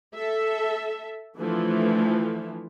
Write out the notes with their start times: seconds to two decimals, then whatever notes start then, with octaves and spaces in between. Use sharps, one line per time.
0.15 A4 E5
1.37 D3 E3 F3 A3